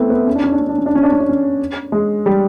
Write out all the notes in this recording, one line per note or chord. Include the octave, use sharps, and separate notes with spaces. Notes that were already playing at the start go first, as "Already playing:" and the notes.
Already playing: A3 B3 C4 E4
B3
C#4
D4
C#4
D4
C#4
D4
C#4
D4
C#4
D4
C#4
D4
C#4
G#3
G3